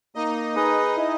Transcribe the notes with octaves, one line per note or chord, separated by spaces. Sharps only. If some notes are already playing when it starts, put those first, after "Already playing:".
A#3 D#4 D#5
D#4 G#4 B4 D#5
E4